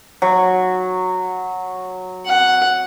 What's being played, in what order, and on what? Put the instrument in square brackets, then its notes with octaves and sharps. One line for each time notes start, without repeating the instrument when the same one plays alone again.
[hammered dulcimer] F#3
[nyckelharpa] F#5